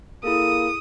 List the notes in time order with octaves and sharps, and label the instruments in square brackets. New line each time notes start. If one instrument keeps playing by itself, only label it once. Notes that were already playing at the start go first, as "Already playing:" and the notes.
[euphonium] A#3 [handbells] E4 G#4 A4 [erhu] D#6